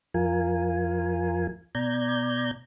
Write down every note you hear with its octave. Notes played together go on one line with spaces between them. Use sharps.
F2 F3 F4 A#4 G#5
B2 D5 A#5 G6 G#6